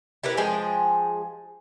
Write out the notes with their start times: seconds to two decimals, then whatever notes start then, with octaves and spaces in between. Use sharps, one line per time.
0.23 E4 G4 A#4 B4
0.37 F3 G#3 G#4 G5